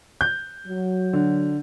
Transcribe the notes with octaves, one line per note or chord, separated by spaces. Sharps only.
G6
F#3
D3